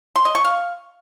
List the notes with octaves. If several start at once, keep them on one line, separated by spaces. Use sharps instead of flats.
C6
D#5
C#6
F5